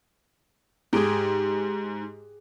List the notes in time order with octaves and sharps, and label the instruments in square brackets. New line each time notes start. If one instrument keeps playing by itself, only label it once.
[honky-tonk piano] G#2 [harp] G4 G#4